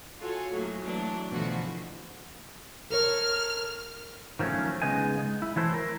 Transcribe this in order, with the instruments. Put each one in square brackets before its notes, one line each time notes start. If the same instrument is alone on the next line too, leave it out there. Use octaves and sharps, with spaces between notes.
[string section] F4 F#4 A4 C#5 G#5
A2 F#3 A#3
E3 F#3 A3 D4
B2 D3 E3 F3 A3 F#4
[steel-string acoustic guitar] A4 A#4 C#5 [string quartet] F6
[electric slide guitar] D#3 F3 F#3 A3 C#4
C#3 G#3 B3 D#4 G#5
G#3
E4
E3 F#3 A3 E4 A4 C5
A#4